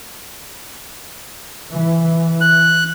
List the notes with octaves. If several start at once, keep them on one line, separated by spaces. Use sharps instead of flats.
E3
F#6